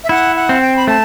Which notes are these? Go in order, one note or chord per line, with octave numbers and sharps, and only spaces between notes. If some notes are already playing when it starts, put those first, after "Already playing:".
E5
E4 F#5
F#5
C4
G5
B5
A3 A5